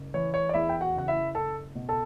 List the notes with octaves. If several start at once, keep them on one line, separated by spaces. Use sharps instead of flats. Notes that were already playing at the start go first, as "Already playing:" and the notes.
Already playing: F#1
E3 C#5
C#5
D5
E2 E4 E5
G5
F#4 F#5
F#1 F#5
E4 E5
F#1 A4 A5
B2
A4 A5